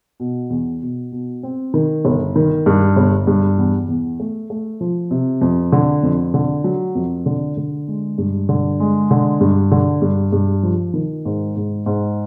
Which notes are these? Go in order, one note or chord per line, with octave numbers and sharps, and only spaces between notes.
B2
E2
B2
B2
C4
D#3
G1
D#3
G2
G1
G2
E2
E2
A3
A3
F3
C3
F2
D3
F2
D3
F#3
F2
D3
D3
G#3
G2
D3
G#3
D3
G2
D3
G2
G2
F3
D#3
G#2
G#2
G#2